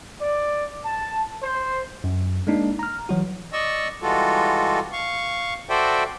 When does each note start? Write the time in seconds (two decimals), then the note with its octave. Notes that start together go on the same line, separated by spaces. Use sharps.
0.22 D5
0.85 A5
1.43 C5
2.04 F#2
2.47 G#3 A#3 D4 D#4
2.79 A#5 F6
3.09 E3 F#3 F#4
3.53 D5 D#5 C#6 E6
4.02 E3 G3 G#3 F4 F#4 A4
4.93 F5 C#6
5.69 F#4 A4 C5 D5 E5 G5